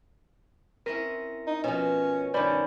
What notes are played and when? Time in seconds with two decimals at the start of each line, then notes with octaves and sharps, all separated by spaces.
0.86 C4 C#4 E4 A#4 A#6
1.47 D#4
1.64 B2 F3 C#4
2.34 G2 D#3 C#4 C5 D5 B5